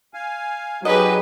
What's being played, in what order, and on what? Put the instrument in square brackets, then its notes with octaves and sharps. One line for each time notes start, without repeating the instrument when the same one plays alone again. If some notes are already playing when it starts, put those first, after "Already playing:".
[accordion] F5 G#5
[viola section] F#3 [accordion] D#4 F#5 [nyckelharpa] G4 B4 [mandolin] G#4 D#5